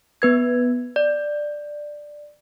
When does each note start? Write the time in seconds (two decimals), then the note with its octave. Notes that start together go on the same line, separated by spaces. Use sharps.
0.22 B3 B4 G#6
0.96 D5